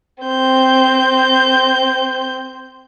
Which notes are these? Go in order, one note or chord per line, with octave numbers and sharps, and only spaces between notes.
C4 G6